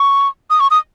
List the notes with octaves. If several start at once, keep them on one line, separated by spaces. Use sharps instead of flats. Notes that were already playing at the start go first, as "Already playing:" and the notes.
Already playing: C#6
D#6
C#6
D#6